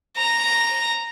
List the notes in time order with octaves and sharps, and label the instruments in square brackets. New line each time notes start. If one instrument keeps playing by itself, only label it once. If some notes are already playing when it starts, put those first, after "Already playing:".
[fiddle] A#5